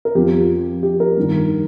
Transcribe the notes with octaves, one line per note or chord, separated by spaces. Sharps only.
A#4
F2 F3 G4
G4
A#4
G2 D#3